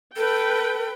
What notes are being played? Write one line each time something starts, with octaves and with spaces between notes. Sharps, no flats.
A4 B4 G5